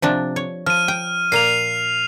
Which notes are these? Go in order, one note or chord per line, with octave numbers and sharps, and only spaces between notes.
C3 F3 D4
C#5
F3 F6 D#7
G5
A#2 A#3 C7 F7